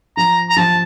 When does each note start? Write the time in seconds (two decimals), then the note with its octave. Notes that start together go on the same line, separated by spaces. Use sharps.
0.17 F3 A#5
0.50 A#5
0.56 F3 A5